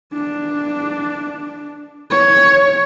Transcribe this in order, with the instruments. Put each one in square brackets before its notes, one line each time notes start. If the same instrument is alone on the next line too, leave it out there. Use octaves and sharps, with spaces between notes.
[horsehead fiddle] D4
C#5